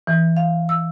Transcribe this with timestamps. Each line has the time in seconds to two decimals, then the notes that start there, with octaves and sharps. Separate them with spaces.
0.07 E3
0.37 F5
0.69 E6